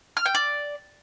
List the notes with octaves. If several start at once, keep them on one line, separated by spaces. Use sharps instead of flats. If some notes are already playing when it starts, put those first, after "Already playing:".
F6
G5
D5